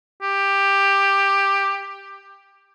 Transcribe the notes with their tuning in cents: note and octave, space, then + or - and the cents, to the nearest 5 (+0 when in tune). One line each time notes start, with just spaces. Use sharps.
G4 +10